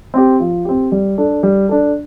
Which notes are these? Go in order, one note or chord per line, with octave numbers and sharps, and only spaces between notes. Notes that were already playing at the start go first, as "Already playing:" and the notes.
C4 G4
F3
C4 G4
G3
D4 A4
G3
D4 A4